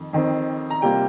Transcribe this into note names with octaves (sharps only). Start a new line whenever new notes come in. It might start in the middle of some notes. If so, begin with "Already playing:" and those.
Already playing: F2 D#3
F2 D#3 C4
A#5
C3 G3 A#3 F4 G5